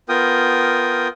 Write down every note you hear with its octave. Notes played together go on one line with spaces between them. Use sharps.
B3 F4 A#4 G5 D#6